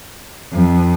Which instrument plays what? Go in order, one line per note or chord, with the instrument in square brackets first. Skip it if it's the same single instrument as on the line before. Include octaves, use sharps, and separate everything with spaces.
[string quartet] F2